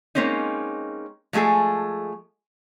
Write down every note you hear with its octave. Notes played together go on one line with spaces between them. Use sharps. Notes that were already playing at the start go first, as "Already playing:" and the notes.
G#3 A#3 C4 C#4 D#4
F3 G#3 A3 G#4 A4